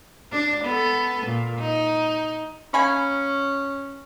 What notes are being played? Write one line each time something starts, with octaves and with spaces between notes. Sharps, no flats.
D4
B3 A4
A#2
D#4
A#3 C#4 G#5 B5